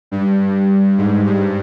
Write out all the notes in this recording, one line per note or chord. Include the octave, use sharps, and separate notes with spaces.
G2
G#2
G2